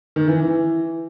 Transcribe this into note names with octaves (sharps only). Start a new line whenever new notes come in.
D#3
E3
E3